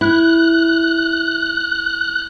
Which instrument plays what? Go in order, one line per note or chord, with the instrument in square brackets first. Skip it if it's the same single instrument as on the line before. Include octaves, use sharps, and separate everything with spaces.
[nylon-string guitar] E4 [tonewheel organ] F#6